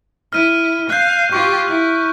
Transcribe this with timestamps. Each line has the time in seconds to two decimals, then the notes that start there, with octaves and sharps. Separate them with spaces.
0.33 E4 F6 D#7
0.90 F5 F#6 G6
1.33 F4 G4 C#6
1.68 E4